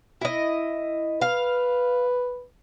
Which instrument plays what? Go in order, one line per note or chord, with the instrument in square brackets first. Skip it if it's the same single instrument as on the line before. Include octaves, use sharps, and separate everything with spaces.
[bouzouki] E4 D#5
[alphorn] B4 [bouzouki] F5